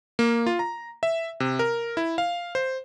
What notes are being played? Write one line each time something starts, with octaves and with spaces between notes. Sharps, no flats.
A#3
F4
A#5
E5
C3
A#4
E4
F5
C5